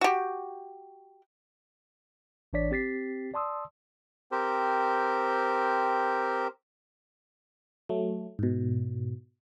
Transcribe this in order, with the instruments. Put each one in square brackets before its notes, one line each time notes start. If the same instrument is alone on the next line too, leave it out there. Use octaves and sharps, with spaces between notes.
[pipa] F#4 G4
[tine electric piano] A1 E3 D4 C#5 D5 B6
C4 G4 A6 B6 C7
D5 A5 C6 D#6 E6
[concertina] C4 G4 A#4 C5
[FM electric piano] F#3 A3
G#2 B2